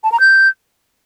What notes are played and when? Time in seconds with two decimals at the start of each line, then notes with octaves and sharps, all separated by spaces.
0.04 A5
0.12 A#5
0.20 G6